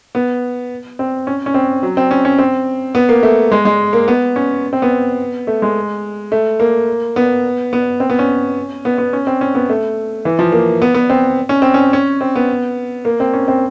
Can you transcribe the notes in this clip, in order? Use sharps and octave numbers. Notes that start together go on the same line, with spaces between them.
B3
C4
C#4
C#4
C4
F#3
C4
C#4
C#4
C4
B3
A#3
A3
G#3
G#3
A#3
B3
C#4
C4
B3
A3
G#3
A3
A#3
B3
B3
C4
B3
C#4
B3
B3
C#4
C4
C#4
B3
A3
E3
F3
A#3
B3
B3
C4
C#4
C4
C#4
C#4
C4
B3
A#3
C4
C#4
C4